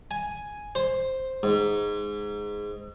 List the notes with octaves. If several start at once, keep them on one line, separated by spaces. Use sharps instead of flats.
G#5
C5
G#2